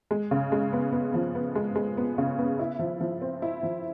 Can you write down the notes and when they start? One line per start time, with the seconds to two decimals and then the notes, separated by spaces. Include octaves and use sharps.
0.11 G#3
0.31 C#3
0.52 G#3
0.73 B3
0.93 B3
1.14 F3
1.35 B3
1.55 G#3
1.76 G#3
1.97 B3
2.18 C#3
2.39 B3
2.59 E4
2.79 F3
3.01 F3
3.21 C4
3.42 E4
3.63 F3